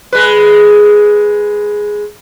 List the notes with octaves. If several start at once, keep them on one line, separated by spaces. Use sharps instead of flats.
G#3 B4